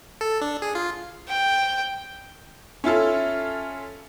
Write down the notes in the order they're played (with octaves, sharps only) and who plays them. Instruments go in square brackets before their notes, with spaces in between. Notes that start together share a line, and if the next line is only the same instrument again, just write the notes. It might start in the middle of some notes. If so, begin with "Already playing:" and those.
[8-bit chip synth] A4
D4
G#4
F4
[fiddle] G5
[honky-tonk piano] C#4 E4 F4 A4